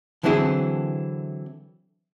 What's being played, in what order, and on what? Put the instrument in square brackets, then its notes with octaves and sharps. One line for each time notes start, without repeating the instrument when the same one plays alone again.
[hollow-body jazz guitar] D3 E3 F#3 C4 E4 G#4